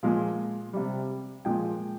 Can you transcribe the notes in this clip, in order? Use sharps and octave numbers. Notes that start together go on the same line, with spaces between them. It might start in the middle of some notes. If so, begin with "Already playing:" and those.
A#2 F3 G#3 F5
C3 G3
A#2 F3 G#3 G5